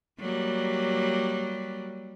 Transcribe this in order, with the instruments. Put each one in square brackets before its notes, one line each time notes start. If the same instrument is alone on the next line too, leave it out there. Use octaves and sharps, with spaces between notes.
[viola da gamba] F#3 G3 A#3